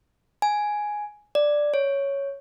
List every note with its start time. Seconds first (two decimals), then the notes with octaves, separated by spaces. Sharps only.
0.42 G#5
1.35 D5
1.74 C#5